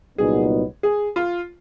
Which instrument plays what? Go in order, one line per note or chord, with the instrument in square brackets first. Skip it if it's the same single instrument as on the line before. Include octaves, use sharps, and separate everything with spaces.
[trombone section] C2 A#2 F#3 B3 D#4 [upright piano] G#4
[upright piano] G#4
F4